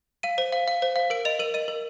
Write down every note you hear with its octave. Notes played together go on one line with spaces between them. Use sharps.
F5 D#7
C5
F5
F5
C5
F5
A#4 D7
D#5 F7
A#4 D#7
D#5 D#7
A#4